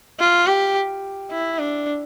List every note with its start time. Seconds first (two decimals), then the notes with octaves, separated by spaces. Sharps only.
0.19 F4
0.47 G4
1.31 E4
1.59 D4